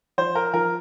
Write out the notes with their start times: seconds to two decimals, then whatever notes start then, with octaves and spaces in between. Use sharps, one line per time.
0.18 F3 C5
0.35 A#4
0.53 F3 A#4